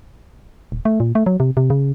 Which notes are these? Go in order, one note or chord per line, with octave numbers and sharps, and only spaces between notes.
D#1
A3
A#2
A3
F#3
C3
C3
C#3